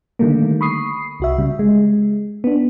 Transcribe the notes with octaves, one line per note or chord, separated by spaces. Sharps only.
D3 D#3 G3 A3 A#3
B5 C#6 D#6 C7
C2 F#4 E5
C#3 G3
G#3
B3 D4